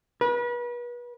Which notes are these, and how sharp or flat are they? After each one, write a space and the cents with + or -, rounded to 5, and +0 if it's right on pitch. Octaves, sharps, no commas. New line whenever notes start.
B4 -35